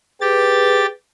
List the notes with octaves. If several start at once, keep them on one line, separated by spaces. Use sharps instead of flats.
G4 G#4 B4 A6